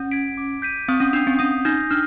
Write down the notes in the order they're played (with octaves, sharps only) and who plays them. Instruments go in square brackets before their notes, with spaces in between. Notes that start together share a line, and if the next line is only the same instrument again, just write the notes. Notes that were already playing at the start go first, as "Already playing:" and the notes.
Already playing: [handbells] C#4
[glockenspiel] G#6 B6 D7
D6
G6 B6 D#7
[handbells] C4 [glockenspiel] D#6
[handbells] C#4
[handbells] D4 [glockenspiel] G6 C7 F7
[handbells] C4
[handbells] C#4 [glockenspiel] D#6
[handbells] D#4 [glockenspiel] G6 A#6
[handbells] D4 [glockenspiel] F6